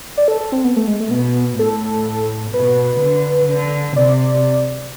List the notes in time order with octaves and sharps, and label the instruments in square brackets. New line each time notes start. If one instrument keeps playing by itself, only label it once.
[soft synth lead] D5
A4
A4
C4
B3
A3
G#3
A3
[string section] B2 [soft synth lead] B3
[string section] A2 [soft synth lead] A4
[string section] B2 [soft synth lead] B4
[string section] D3
D3
[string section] C3 [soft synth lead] D5